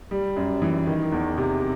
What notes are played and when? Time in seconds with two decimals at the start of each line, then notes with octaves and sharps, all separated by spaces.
0.11 G3
0.37 F#2
0.62 E3
0.87 D#3
1.12 E2
1.38 C3